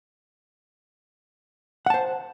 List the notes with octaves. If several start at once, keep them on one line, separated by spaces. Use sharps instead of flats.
C5 F#5 A5